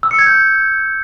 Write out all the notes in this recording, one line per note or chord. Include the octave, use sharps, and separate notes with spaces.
E6
C#7
G#6
G6